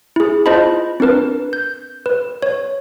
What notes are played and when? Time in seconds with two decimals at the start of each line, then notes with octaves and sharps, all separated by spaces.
0.16 E4 G#4
0.46 E4 F4 C5 D#5 A5 B5
1.00 C4 D4 A#4 B4
1.53 G6
2.06 B4
2.42 C#5